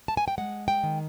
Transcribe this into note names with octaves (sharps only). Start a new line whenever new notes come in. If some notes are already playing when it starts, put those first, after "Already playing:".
A5
G#5
G5
G#3 F#5
G5
D#3